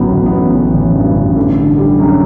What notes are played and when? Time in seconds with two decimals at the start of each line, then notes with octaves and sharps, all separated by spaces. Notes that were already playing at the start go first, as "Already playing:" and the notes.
Already playing: A1 F#3 B3
0.12 A1
0.26 B3
0.33 A1
0.54 A1
0.74 A1
0.95 G2
1.15 A1
1.36 D3
1.57 D3
1.77 G3
1.99 F#2